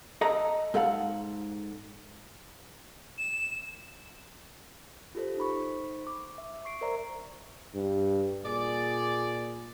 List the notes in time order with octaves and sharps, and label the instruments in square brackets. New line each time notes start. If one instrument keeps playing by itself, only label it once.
[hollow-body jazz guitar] A4 D#5 A#5
G#2 A4 F5 F#5
[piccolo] E7
[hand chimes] F4 G4 A4 C5
D#4 C5 B5 C#6
D6
E5
C#6 C7 D7
A#4 C5 D5 E5 A#5
[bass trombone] G2
[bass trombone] A#2 [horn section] G#4 D5